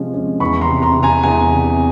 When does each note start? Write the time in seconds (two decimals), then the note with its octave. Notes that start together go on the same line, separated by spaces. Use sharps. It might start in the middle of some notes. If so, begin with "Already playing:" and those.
Already playing: C3 F3 G#3 C#4
0.14 C#4
0.40 E2 B5 C#6
0.61 A#5 C6
0.68 C3
0.82 A#5 C6
0.96 C3
1.03 G#5 A#5
1.23 E2 G#5 A#5
1.52 C3